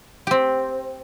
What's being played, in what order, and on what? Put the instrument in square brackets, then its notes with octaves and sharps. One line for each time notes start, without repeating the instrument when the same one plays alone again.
[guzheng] C4 G4